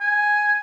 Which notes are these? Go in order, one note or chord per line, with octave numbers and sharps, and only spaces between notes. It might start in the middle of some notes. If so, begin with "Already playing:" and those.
G#5